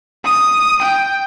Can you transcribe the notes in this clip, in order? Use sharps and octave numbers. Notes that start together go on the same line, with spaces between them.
D#6
G5